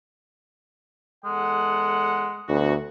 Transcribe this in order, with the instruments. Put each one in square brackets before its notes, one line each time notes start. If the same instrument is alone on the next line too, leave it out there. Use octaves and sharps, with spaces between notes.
[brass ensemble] E2 A4 F#5 [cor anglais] G#3
[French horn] D2 [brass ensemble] B3 F#4